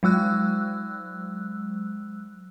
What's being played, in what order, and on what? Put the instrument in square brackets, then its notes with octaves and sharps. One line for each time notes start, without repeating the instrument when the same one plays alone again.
[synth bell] F#3 G#3 E6 F#6